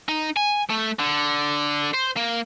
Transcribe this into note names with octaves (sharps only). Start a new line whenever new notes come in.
D#4
G#5
A3
D3
C5
A#3